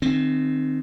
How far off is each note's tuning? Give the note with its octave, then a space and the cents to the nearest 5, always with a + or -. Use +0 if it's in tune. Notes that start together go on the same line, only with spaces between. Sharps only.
D#3 -20 C4 +0